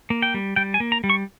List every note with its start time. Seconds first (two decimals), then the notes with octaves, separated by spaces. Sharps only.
0.10 A#3
0.22 G5
0.34 G3
0.56 G3 G5
0.74 G#5
0.80 A#3
0.92 A#5
1.04 G3
1.10 C#6